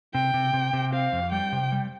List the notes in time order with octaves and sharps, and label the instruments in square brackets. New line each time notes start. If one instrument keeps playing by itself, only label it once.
[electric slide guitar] C3 [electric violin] G5
[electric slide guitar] C3
C3
C3
[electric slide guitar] C4 [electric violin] F5
[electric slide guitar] F2
[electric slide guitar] G3 [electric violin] G5
[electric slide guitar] C3
G3